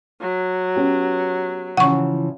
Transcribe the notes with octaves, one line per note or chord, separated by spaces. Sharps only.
F#3
B3 C#4 G4
C#3 E3 F3 F#5 C#6